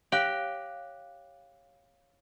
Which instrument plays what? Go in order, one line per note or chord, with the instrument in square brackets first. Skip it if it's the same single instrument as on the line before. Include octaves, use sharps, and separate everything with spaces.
[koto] G4 [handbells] C#5 F5 F#6